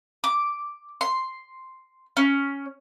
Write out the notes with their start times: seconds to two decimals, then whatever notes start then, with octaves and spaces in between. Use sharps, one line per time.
0.24 D6
1.01 C6
2.17 C#4